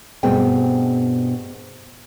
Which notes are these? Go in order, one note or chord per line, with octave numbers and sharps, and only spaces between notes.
G2 B2 A3 C4 G#4 G5